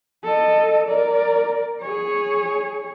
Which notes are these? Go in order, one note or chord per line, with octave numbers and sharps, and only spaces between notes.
A4 D#5
A#4 D5
G#4 C#5